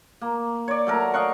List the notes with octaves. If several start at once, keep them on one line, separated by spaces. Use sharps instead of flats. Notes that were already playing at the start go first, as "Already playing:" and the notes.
A#3
C#5 D5
F#3 A3 A#4
D#5 F5 F#5 C#6